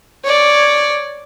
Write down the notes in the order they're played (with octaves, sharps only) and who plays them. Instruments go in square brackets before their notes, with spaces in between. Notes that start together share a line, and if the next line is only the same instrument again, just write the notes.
[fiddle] C#5 D5